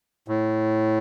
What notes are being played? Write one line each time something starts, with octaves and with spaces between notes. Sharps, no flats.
A2